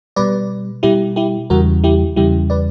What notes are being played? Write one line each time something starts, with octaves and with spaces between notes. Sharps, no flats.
B2 G3 B4 D5
B2 G3 E4 G4
E4 G4
E2 C#3 E3 G3 F#4 A#4
E4 G4
E2 C#3 E3 G3 E4 G4
B4 D5